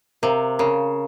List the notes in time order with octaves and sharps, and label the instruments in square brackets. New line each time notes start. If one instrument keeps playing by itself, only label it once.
[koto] C3 [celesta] A#4 F5 A#5
[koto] C#3 [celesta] A#4 F5 A#5